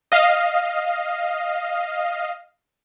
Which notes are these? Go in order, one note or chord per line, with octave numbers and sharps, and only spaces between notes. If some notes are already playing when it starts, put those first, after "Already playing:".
D#5 F5